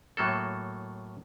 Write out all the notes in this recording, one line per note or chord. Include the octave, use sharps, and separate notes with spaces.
A2 F#3 A#3 A4